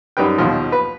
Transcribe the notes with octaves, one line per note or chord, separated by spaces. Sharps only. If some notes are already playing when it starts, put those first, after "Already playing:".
F#2 G3 D#4 B4 G5
D#2 B2 F3
B4